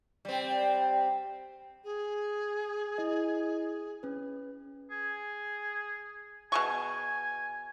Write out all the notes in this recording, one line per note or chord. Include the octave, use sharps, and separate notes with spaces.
G3 C4
G#4
E4 D#5
C#4 B4
G#4
B2 G#4 G#5 C#6